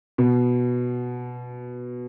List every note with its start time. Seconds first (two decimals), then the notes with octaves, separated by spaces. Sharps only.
0.18 B2